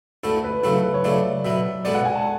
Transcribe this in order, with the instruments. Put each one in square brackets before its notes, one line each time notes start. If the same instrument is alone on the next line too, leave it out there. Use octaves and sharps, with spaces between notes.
[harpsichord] D2 D3 A3 E4 [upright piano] A4
[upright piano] B4
[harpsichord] C#3 F#3 A3 E4 [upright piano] A4
[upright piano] A4
B4
C#5
[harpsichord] C#3 F#3 A3 E4 [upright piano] D5
[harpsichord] B2 F#3 B3 [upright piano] E5
[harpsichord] B2 G#3 B3 D4 A4 [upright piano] D5
[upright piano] F#5
G#5
A5